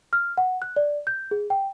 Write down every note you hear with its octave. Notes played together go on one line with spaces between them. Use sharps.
F6
F#5
F#6
D5
G6
G#4
G5